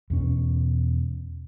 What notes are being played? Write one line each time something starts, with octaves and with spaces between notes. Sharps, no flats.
E2 B2 C#4